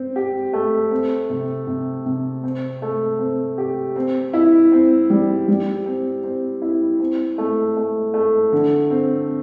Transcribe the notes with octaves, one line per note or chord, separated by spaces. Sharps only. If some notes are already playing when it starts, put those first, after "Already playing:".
Already playing: C4
G4
A3
C4
C3
C3
C3
C4
A3
C4
G4
C4
E4
C4
G3
G3
C4
C4
E4
C4
A3
A3
A3
D3
C4